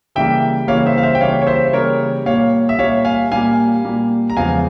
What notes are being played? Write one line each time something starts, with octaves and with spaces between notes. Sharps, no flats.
C#3 E3 G3 A#3 E5 G5
C#3 E3 G3 A#3 C#5 F5
C5 E5
F5
C5 E5
G5
C#3 E3 G3 A#3 C#5 F5
C#5
C5 E5
C#3 E3 G3 A#3 A#4 C#5
A#2 G3 A#3 C#5 F5
E5
A#2 G3 A#3 C#5 F5
F5 G#5
A#2 G3 A#3 F5 G#5
A#2 G3 A#3
A#5
E2 C#3 F3 G#3 F5 G#5